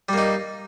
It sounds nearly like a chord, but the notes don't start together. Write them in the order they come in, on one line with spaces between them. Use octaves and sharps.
G3 A#3 D#4